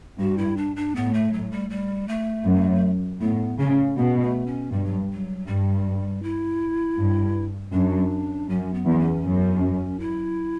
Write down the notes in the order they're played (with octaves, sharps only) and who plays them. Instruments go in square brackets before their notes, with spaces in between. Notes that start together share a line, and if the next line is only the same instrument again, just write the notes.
[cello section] G2 [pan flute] F#4
[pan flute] E4
D4
D4
[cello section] A2 [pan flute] B3
[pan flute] A3
F#3
G3
G3
A3
[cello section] F#2
[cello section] A2 [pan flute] B3
[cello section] C#3 [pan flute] C#4
[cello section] B2 [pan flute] B3
[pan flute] A3
C#4
[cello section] G2 [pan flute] G3
[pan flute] F#3
F#3
[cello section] G2 [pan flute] G3
[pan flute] E4
[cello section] G2
[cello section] F#2 [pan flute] D4
[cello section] F#2 [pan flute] C#4
[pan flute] B3
[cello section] E2 [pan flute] B3
[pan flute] C#4
[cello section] F#2
[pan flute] E4